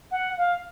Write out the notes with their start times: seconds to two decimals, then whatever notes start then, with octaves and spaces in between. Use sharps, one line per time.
0.11 F#5
0.37 F5